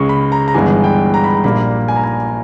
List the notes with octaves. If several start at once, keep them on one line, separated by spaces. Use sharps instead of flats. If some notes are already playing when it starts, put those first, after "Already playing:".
Already playing: C#2 C#3 G#3 C#6
B5
A#5
A#5
G1 G2 E3 G#3 B3 G#5
G5
A#5
B5
A#5
A#1 A#2 G3 A#3 B5
G#5
A#5
G#5